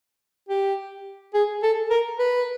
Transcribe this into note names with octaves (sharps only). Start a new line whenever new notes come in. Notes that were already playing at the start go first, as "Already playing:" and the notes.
G4
G#4
A4
A#4
B4